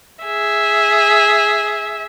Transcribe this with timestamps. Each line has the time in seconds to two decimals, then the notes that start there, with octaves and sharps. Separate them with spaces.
0.24 G#4 E5